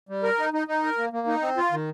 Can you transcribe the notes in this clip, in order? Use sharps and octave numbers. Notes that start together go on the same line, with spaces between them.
G3
A#4
D#4
D#4
D#4
A#4
A#3
A#3
D#4
C4
F4
D#3